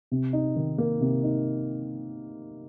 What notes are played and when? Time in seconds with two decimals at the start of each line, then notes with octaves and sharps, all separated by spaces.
0.11 C3
0.33 D#4
0.56 D#3
0.78 A#3
1.01 C3
1.24 D#4